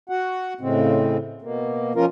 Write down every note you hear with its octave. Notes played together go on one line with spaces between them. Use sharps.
F#4 F#5
A2 C#3 G#3 C4
B2 A#3
F3 C#4 F4 A#4